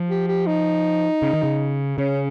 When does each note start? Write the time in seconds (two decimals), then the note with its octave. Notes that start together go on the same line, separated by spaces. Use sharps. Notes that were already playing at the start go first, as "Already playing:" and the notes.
Already playing: F3
0.09 G4
0.28 G4
0.47 D#4
1.22 C#3
1.33 D#3
1.43 C#3
1.98 C#3 C#4